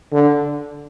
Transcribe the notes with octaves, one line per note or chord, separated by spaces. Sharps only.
D3